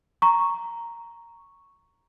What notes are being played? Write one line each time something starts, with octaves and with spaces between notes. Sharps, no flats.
A#5 C#6